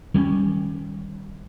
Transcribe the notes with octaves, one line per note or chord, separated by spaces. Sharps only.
D#3 G3 A3 C#4